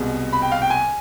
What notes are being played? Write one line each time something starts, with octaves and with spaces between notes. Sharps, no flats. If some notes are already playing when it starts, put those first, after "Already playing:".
Already playing: C2 B2 G#3
B5
G5
F5
G5
G#5